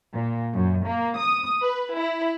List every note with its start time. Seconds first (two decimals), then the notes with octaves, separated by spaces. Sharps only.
0.13 A#2
0.53 F#2
0.85 A#3
1.16 D#6
1.61 B4
1.97 E4